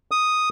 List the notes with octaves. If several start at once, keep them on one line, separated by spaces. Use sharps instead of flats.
D#6